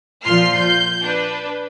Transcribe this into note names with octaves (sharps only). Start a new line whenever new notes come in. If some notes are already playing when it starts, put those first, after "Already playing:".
A#2 F3 F4 C6 F6 C7
G6
D4 B4